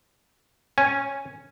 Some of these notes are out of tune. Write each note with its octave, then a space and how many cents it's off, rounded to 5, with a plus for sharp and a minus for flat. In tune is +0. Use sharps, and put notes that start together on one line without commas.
C#4 -5 G#5 -5